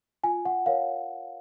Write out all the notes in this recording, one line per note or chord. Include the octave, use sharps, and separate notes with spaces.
F4 G#5
F#5
A#4 C#5 F5